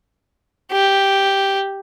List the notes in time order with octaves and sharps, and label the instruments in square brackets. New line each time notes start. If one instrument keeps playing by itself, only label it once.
[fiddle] G4